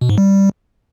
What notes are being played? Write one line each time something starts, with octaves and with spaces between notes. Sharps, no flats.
B2
G#2
G3